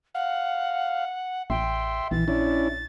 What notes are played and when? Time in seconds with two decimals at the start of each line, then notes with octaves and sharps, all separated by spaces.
0.15 F5 F#5
1.50 A1 E5 G5 C6
2.11 A#1 E3 A6
2.28 C#4 D4 E4